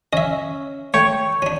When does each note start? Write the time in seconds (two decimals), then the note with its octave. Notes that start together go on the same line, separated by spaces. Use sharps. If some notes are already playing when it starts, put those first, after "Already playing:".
0.13 C#4 D#5 E5
0.94 A3 C#5 G5
1.42 C#4 D4